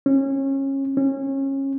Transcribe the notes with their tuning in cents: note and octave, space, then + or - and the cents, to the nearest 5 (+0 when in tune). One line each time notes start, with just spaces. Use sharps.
C#4 -25
C#4 -25